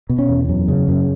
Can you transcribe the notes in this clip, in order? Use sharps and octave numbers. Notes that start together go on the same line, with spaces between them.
B2
C#4
E2
F#2
C#3
F#2